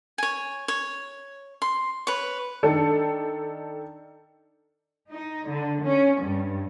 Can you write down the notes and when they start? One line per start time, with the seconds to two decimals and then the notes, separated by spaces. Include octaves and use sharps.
0.18 C#5 G#5
0.68 C#5
1.62 C6
2.07 B4 C#5
2.63 D#3 D4 A4
5.11 D#4
5.48 D3
5.84 C#4
6.21 G2